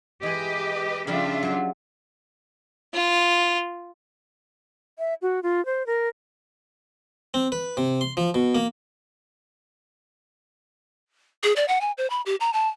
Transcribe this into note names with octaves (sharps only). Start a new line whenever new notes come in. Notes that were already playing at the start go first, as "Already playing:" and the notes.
E3 G#3 G4 B4 D#5
C#3 F3 G3 D4 F4 E5
F#3 C5 F#5
F4
E5
F#4
F4
C5
A#4
C4
B4
C3
C6
F3
B2
A#3
G#4
D5
F#5
G#5
C5
B5
G4
A#5
A5